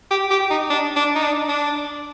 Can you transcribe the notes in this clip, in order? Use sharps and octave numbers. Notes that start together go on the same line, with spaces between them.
G4
G4
D#4
D4
D4
D#4
D4
D4